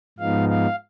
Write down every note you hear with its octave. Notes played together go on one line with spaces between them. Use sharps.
G#2 F3 G#3 B3 D#4 F5
F5